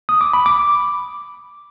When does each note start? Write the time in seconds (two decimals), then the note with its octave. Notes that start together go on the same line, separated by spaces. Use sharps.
0.09 D#6
0.21 D6
0.33 B5
0.46 D6